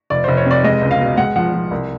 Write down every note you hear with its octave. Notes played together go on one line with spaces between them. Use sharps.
F1 D5
F1 C5
C#5
C3 D5
G#3 D#5
C#2
F5
B2
G#3 F#5
F3 F#5
F3
C2